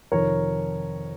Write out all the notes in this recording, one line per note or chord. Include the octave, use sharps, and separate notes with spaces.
F2 C3 D#3 A#4 C#5